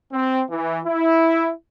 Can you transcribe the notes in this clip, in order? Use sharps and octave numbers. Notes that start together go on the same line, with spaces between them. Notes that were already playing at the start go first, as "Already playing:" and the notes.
C4
E3
E4